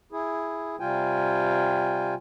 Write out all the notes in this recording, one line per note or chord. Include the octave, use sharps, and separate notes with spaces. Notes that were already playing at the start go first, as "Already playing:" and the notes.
E4 G#4
C3 G3 F4 G5 G#5